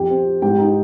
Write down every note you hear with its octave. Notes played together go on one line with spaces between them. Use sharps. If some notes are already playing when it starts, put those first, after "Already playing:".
Already playing: F2 G4 G5
C4
F3
G#2 G4 G5
D#4